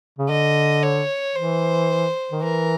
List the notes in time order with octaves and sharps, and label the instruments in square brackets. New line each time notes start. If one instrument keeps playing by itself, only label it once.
[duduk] C#3
[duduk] D3 [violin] D#5
[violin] C#5
[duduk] E3 [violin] C5
[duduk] D#3
[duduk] E3 [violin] A#4